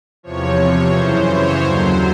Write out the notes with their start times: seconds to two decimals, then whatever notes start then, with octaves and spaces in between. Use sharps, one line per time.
0.23 E2 C3 F3 C#5
0.91 F#2 C#3 E3 C5
1.25 C#5
1.59 D#2 D3 F#3 C5